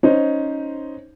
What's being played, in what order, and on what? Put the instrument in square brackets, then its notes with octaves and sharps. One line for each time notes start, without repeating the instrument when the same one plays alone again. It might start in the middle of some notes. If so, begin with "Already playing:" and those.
[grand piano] C#4 D#4 C5